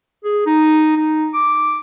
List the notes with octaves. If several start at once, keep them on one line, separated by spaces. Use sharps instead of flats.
G#4
D#4
D#4
D6